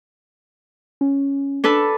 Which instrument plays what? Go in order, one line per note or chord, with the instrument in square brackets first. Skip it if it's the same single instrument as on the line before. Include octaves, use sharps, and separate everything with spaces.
[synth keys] C#4
[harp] D4 A4 B4